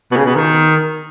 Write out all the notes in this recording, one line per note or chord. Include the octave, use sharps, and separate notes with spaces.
B2
C#3
B2
D#3